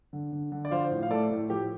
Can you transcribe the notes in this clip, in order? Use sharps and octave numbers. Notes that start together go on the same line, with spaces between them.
D3
D3
D3
D5
F3 C5 F5
A2
F5
A3 A4 D5
A2
F3 G4